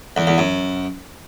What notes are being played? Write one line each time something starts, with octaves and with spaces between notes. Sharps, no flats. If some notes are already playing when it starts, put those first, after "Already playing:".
E2
E2
F#2